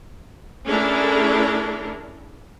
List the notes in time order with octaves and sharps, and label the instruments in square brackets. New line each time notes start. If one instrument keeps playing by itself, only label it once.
[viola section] A3 C#4 D4 E4 G#4 A#4